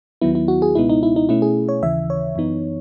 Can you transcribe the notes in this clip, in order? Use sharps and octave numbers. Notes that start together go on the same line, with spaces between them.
D#2 D#3 F#3 B3 E4
E4
F#4
G#4
C#2 B2 G#3 B3 D#4 E4
D#4
E4
D#4
B2 A3 C#4 E4
G#4
C#5
D#2 C#3 E3 E5
C#5
F#2 E3 B3 D#4